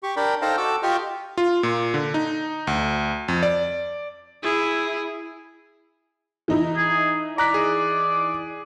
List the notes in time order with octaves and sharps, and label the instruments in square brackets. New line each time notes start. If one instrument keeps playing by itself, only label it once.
[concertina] G4 C#6
D4 A#4 D5 G5 B5
D#4 A4 C5 F5 G5 A#5
F#4 A4 D6 E6
F4 G4 D#5 G5 C#6 F6
[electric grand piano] F4
A#2
D3
D#4
D2
F2
D5
[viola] E4 [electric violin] G#4
[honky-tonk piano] E3 D#4 E4
[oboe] G#4
[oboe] D5 [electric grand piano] A#5 F#6 B6
[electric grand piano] G#4